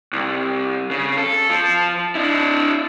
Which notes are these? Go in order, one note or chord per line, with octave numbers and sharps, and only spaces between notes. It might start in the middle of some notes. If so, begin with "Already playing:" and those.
C2
C#3
A4
F3
D4 E4